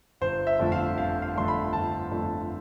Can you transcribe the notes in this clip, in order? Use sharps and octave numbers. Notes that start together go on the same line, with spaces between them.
G1 C5
E5
F2 D3 A3
F5
G1 F5
F5
F2 D3 A3 C6
B5
G1 A5
F2 D3 A3